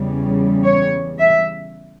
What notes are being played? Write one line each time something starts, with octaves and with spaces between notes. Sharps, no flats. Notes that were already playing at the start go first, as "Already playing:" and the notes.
Already playing: E2 C#3 G3
C#5
E5